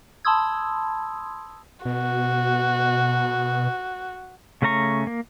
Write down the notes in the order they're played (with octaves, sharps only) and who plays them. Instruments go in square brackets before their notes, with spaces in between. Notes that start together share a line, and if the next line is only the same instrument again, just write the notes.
[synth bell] A5 B5 C6 D#6 E6 G#6
[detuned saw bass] B2 [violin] F#4
[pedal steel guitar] C#3 A3 C#4 A#5 C#6
A#3